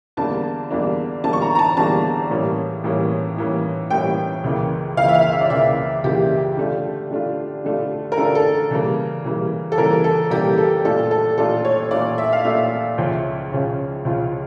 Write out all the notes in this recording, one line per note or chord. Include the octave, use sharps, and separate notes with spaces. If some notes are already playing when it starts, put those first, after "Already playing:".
E2 D3 G3 A#3 D4 A5
E2 D3 G3 A#3 D4
E2 D3 G3 A#3 D4 A5
C#6
A#5
A#5
A5
E2 D3 G3 A#3 D4 A5
A2 E3 G3 A#3 C#4
A2 E3 G3 A#3 C#4
A2 E3 G3 A#3 C#4
A2 E3 G3 A#3 C#4 G5
C#2 C#3 E3 A#3
C#2 C#3 E3 A#3 F5
E5
F5
E5
D5
C#2 C#3 E3 A#3 E5
C#2 C#3 E3 A#3 G4
D3 A3 D4 F4
D3 A3 D4 F4
D3 A3 D4 F4
A#4
D3 A3 D4 F4 A4
A4
C#3 E3 G3 A#3
C#3 E3 G3 A#3
A4
C#3 E3 G3 A#3 A#4
A4
C#3 E3 G3 A#3 G4
A4
A#2 A3 D4 F4 A4
A4
A#2 A3 D4 F4 A4
C#5
A#2 A3 D4 F4 D5
E5
F5
A#2 A3 D4 F4 E5
C#2 C#3 F3 C#4 F4
C#2 C#3 F3 C#4 F4
C#2 C#3 F3 C#4 F4